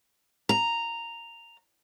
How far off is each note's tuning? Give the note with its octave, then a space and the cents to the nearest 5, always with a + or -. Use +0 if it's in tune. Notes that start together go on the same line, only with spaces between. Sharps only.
A#5 -5